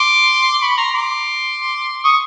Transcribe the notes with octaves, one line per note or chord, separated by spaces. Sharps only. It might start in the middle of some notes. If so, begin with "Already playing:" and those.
Already playing: C6 D6
B5 C#6
A#5 C6
C6 D6
C#6 D#6